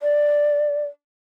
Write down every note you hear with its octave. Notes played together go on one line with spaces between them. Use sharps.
D5